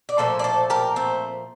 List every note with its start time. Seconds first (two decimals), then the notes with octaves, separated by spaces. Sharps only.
0.09 D5
0.18 A#2 F3 A3 A4 C5
0.39 D5
0.44 A4 C5
0.70 G4 A#4
0.96 A3 C4